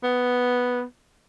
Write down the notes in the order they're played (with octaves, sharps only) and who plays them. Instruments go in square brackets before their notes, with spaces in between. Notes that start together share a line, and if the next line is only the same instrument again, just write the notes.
[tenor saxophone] B3